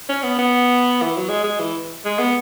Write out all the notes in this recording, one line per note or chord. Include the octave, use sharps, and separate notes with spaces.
C#4
B3
B3
E3
F#3
G#3
G#3
E3
G#3
B3